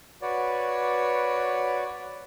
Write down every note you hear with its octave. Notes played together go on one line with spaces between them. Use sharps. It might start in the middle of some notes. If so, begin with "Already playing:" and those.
F#4 B4 C#5 D5